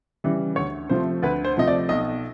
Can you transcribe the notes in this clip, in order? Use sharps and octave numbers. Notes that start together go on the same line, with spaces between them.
C#3 E3 G3
D2 C#5
C3 F3 A3 C5
D2 B4
C5
C3 F3 A3 D#5
D5
B1 D#5